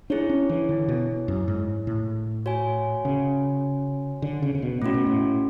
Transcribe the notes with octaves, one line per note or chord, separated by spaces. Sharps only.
D4 E4 G#4 C#5
C#4
E3
D3
B2
F#2
G#2
A2
F#4 C#5 G#5
C#3
D3
C#3
C#3
B2
A2 A3 C#4 F#4
B2
A2